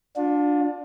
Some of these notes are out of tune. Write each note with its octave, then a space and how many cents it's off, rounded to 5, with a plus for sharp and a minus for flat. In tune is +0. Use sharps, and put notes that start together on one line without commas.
D4 +0 F4 +40